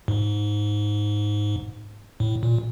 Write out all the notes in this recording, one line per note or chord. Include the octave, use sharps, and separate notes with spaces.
G#2
A2
A#2